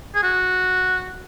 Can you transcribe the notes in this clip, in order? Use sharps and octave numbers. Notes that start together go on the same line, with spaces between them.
G#4
F#4